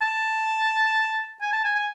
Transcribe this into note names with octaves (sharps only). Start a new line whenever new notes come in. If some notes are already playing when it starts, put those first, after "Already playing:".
A5
G#5
A5
G#5
G#5